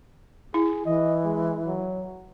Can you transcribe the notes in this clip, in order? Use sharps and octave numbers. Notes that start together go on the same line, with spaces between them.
E4 G#4
E3 D#5
G#3
F#3